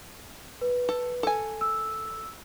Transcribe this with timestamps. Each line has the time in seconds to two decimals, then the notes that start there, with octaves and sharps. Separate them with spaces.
0.61 B4
0.89 A4
1.23 A4 G#5
1.61 E6